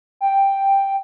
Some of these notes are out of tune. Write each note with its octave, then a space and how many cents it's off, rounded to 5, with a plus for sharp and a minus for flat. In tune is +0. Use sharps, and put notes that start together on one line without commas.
G5 +5